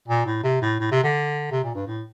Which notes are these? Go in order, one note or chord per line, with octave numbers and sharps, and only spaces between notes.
A#2
A2
C3
A2
A2
C3
D3
C3
A#2
G2
A2